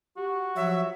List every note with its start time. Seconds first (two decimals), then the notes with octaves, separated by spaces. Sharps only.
0.17 F#4 G4
0.56 F3 F#3 E5